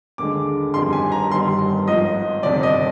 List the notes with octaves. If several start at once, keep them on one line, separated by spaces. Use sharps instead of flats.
D#2 D3 G#3 D6
G1 F2 D#3 G3 C6
G#5
A#5
G1 G2 D#3 G3 C6
G#1 G#2 F3 D#5
G1 F2 C3 D#3 D5
D#5